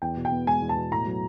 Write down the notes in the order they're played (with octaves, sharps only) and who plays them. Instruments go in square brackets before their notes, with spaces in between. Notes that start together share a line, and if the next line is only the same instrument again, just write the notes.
[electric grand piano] E2 [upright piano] G5
[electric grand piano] B2
[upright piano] G5
[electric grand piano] B3
[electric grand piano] G#3 [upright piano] G#5
[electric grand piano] E2
[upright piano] A5
[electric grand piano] B2
[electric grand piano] A2 [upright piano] A#5
[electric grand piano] F#3